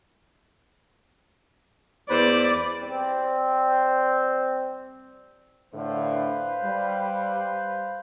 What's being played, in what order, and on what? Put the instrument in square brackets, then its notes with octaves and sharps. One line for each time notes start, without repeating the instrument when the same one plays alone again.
[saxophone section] E2 B4 C5 [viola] D5
[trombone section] G3 C4
[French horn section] A2 D3 [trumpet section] B4 C5 F5
[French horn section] G3